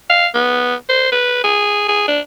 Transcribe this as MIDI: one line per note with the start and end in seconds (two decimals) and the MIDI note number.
0.09 0.26 77
0.34 0.75 59
0.89 1.09 72
1.12 1.39 71
1.43 1.83 68
1.88 2.03 68
2.08 2.19 62